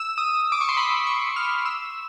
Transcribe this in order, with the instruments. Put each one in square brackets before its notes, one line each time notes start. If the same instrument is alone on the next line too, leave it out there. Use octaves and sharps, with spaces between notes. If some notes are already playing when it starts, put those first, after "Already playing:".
Already playing: [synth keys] E6
D#6
D6
C#6
C6
B5
C#6
F6
E6